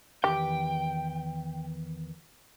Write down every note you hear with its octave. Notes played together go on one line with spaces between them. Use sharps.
E2 D#3 G4 B4 G5